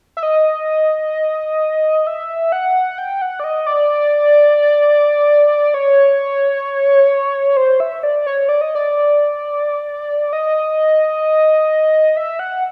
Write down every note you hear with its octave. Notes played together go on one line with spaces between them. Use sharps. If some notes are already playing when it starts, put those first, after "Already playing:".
E5
D#5
E5
F#5
G5
F#5
D5
D#5
D5
C#5
C5
E5
D5
C#5
D5
D#5
D5
D#5
E5
F#5